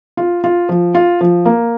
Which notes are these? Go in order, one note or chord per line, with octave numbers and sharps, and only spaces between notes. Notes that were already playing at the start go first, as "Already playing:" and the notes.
F4
F4
F3
F4
F3
A#3